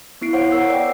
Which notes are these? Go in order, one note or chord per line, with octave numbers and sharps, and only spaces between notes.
B3 E4 C7 D7
C5 C#5 F5 F#5
B3 A#4 F#5 E6 C7
D5 G5